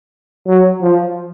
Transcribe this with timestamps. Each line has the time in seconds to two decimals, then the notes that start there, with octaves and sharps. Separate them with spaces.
0.47 F#3
0.82 F3